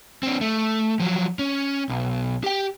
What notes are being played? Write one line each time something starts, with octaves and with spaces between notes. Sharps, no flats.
C4 D4
A3
F3 F#3
C#4
B1
G4 G5